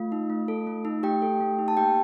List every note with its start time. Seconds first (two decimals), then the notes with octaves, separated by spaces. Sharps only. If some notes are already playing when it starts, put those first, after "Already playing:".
Already playing: A3 F4 F5
0.12 D#4
0.30 A3
0.48 A4
0.67 A3
0.85 D#4
1.03 A3 G4 G5
1.22 A4
1.40 A3
1.59 D#4
1.68 A5
1.77 A#3 G4 G5